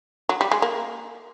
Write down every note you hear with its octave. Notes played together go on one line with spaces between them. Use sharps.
F#3
G3
G#3
A#3